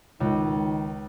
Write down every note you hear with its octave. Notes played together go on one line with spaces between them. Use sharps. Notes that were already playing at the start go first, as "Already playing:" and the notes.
C#2 D#3